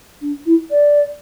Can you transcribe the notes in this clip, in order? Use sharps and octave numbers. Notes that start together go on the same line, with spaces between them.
D4
E4
D5